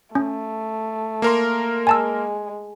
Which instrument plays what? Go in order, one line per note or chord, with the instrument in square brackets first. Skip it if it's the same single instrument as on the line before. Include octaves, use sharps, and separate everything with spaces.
[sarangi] A3 [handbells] C#4
[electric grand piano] A#3 A#4 C6
[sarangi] G#3 [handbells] G#5 A5 E6